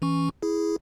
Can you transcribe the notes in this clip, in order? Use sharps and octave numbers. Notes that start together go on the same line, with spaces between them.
E3 C#4 C#6
E4 G#4